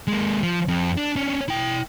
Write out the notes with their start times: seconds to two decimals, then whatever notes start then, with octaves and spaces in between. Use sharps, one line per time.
0.08 G#3 A#3
0.43 F3
0.68 F2
0.97 D4
1.16 C#4 D4
1.48 E4 G5